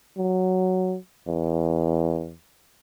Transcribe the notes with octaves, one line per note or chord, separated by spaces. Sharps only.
F#3
E2